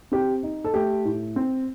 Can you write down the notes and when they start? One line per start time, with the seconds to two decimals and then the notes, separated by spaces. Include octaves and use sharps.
0.12 C4 G4
0.43 D#4
0.64 A4
0.74 A3 G4
1.05 A2
1.36 C4